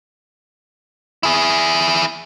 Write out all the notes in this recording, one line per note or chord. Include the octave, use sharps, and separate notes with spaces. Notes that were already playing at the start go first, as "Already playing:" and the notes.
E4 G#4